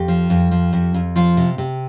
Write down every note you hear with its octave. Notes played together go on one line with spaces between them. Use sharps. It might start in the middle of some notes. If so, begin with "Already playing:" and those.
Already playing: F2 G4
F3
F2
F3
F2
F2
F3 F4
C3
C3